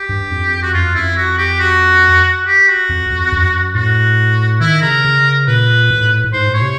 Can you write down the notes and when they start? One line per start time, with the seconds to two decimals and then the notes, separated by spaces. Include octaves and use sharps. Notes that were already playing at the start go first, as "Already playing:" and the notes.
Already playing: G4
0.09 G2
0.31 F2
0.63 F#4
0.74 F#2 F4
0.95 F2 E4
1.16 F#4
1.39 G4
1.60 F#4
2.46 G4
2.68 F#4
2.89 F2
3.10 F2
3.32 F#2
3.75 A2 F#4
4.61 D#3 E4
4.82 C#3 A#4
5.05 C#3
5.47 A#2 B4
5.90 A2
6.24 A2
6.33 G#2 C5
6.48 A2
6.54 C#5
6.62 C3